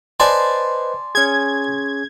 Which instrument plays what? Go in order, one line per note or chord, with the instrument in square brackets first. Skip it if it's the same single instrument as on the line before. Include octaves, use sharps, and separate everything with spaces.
[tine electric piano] B4 C5 D#5 [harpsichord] D5 G#5 A5 [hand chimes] C6
[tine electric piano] C#4 G#4 [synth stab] G#6